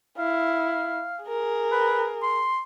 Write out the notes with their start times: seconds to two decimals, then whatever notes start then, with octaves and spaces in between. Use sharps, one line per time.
0.18 E4 F5
1.25 G#4 A#4
1.72 B4
2.23 C6